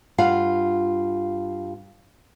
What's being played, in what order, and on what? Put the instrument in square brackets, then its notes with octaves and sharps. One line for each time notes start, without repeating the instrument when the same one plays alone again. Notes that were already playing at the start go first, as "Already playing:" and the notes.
[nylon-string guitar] G2 F4 F5 F#5